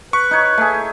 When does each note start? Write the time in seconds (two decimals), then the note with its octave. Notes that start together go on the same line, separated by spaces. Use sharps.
0.13 B4 C#6
0.31 D#4 C#5
0.58 A3 G#4